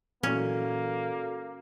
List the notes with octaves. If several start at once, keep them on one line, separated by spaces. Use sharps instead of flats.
A#2 E3 F#3 A#3 C#4 F#4 A4 D5